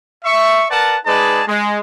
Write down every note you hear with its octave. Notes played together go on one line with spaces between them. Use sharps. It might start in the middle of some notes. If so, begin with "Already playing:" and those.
E5 C#6
A#4 B4 D5 F#5 A5
G#3 D#4 G#4 B4 D5 A5
G#3